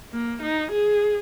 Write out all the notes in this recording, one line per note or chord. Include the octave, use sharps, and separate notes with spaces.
A#3
D#4
G#4